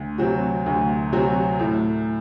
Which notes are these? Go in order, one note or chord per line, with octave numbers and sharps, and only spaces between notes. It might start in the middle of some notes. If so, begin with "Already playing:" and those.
Already playing: D2
C3 F#3 C4 F#4
D2
C3 F#3 C4 F#4
A2